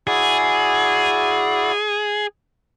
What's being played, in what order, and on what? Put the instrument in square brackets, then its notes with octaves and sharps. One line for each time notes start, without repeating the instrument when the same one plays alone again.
[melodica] E4 F#4 D5 [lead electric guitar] G#4